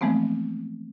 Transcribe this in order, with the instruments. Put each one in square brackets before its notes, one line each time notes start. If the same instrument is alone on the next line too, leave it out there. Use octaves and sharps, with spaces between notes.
[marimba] E3 F3 G#3 A3 B3 C4